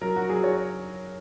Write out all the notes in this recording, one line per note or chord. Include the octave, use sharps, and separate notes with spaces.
F#3 A#4
F#4
F#3 G#4
C#5